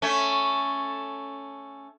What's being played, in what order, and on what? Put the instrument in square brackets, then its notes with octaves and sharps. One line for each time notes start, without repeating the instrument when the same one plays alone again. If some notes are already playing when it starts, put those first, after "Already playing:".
[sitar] A3 C#4